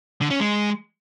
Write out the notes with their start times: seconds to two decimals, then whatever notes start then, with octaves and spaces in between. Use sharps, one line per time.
0.21 D3
0.31 C#4
0.40 G#3